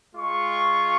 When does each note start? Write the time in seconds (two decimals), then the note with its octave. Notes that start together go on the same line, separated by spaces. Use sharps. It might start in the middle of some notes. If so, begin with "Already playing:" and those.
0.15 G#3 F4 C#6